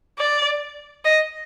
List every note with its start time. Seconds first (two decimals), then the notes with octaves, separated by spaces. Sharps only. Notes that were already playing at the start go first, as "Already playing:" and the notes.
0.19 D5
1.05 D#5